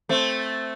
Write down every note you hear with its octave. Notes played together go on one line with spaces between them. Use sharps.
A3 C4